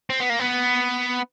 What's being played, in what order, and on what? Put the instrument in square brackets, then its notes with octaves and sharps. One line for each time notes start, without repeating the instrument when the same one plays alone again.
[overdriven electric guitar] C4
B3
A#3
B3